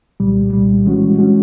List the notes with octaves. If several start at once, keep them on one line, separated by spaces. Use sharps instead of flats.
C2 A#2 G3
C2 A#2 G3
E3 G#3 C#4 F#4
E3 G#3 C#4 F#4